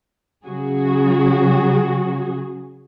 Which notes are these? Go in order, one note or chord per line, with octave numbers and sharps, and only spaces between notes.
C#3 F#3 F#4 G#4